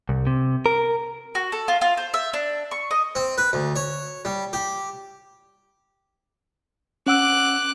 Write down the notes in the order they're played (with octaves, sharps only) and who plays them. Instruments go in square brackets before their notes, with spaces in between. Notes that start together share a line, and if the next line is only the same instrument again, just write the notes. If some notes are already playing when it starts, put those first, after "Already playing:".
[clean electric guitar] C2
C3
A#4
[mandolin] F#4
A4
F4
F4
C5
E5
D4
C#6
D#5
[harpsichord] C4
B4
D2
C#5
G3
G4
[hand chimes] C#4 F#5 E6 [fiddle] D6 F#6